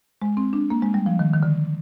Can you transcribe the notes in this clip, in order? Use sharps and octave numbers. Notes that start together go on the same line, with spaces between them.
G#3
C4
D4
A#3
G#3
G3
F3
D#3
D#3
D3